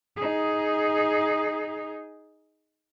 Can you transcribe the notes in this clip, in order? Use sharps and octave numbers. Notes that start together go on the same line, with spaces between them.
D#4 G#4